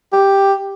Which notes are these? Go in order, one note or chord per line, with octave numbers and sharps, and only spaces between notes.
G4